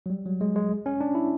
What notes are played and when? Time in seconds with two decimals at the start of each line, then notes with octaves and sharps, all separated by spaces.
0.06 F#3
0.10 G3
0.26 F#3
0.41 G#3
0.56 G#3
0.86 C#4
1.01 D4
1.15 E4